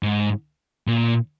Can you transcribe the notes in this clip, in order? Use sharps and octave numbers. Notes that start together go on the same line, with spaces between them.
G#2
A#2